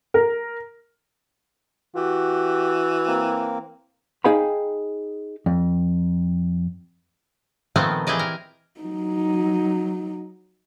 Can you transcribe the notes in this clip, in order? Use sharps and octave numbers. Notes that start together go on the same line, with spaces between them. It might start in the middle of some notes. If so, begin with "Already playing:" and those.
A#4
E3 F#4 G4
A#3 C4
D#4 G#4 F5 G5 B5
F2
A#2 D#3 F3 A3 B3 C4
E3 G4 G#4 D5 D#5
A#4
F#3 D#4